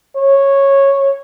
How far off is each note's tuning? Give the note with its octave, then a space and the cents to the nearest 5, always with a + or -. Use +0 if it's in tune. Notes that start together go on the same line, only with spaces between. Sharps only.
C#5 -10